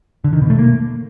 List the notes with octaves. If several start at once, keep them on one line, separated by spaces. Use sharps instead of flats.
D3
D#3
B2
A3
A#3